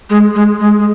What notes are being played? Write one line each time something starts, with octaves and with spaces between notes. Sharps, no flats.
G#3
G#3
G#3
G#3